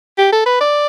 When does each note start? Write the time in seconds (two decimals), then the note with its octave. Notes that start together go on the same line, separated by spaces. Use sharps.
0.18 G4
0.32 A4
0.46 B4
0.60 D5